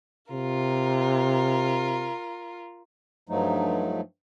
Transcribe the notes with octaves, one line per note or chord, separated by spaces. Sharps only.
C3 F4 A#4
G2 F3 F#3 A3 D#4